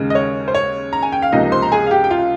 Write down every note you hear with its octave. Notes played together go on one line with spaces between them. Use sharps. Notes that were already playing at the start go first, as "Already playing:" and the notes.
Already playing: D#2 C#3 G#3
D#5
C#5
C5
C#5
A#5
G#5
G5
F5
C#2 C3 F3 A#3 D#4 D#5
C5 C6
A#5
G#4 G#5
F5
G4 G5
G5
F4 F5